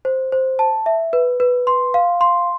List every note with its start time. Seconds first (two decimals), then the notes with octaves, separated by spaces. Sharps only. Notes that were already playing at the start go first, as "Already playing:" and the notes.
0.05 C5
0.32 C5
0.59 A5
0.86 E5
1.13 B4
1.40 B4
1.67 C6
1.94 F5
2.21 C6